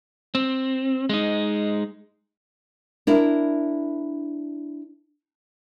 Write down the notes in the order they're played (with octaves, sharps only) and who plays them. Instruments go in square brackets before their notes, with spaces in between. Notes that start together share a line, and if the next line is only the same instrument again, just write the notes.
[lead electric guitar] C4
G#3 D#4
[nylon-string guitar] D4 E4 A#4